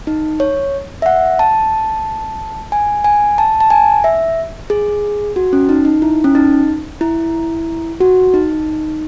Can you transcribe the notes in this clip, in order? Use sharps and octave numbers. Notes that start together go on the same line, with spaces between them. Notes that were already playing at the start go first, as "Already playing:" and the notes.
D#4
C#5
E5
F#5
A5
G#5
G#5
A5
A5
G#5
E5
G#4
F#4
C#4
D#4
D#4
E4
C#4
D#4
E4
F#4
D#4